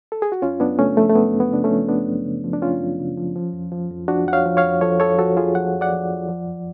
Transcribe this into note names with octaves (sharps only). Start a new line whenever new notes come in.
A4
G#4
F#4
F#2 C#4 F4
F#2 B3 D4
C#3 A3 C#4
F3 A3
A3
F#2 B3
F#2
B3
C#3 D4
A3 C#4
F3
F#2 B3 D4
F#2
C#3
F3
D4
F#2 C#4 F4
F#2
C#3
F3
F3
F2
F3
F2
F3 D4 F#4
F2 F#5
C#5 F5
F3
C#5 F5
F2
F3 A4 C#5
F2 A4 C#5
F3 F#4 A4
F2 F4 G#4
F3 F#5
F2
D5 F#5
F3
F2
F3
F#2